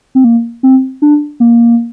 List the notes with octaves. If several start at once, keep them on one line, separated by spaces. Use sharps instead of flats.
C4
A#3
C4
D4
A#3